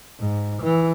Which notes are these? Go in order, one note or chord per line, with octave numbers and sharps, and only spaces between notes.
G#2
E3